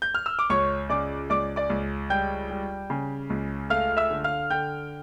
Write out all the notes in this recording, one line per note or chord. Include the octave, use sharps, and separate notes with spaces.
G6
F6
E6
D6
C#2 C#5 C#6
C#3 D5 D6
C#2 D5 D6
D5 D6
C#2
G3 G5 G6
G3
C#3
C#2
A3 F5 F6
E5 E6
D3
F5 F6
D3 G5 G6